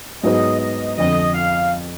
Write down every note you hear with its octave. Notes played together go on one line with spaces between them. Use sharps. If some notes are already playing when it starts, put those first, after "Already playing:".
G#2 F#3 B3 D#4 G#4 D#5
D#5
F2 D3 F3 D#5
F5